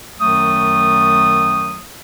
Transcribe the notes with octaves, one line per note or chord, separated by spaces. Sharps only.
F#2 D#3 F#3 A3 D#6